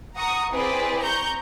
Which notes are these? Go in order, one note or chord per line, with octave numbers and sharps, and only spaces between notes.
F#5 A#5 C#6 D#6
C4 E4 G#4 B4 D5
A#5 C#6 G6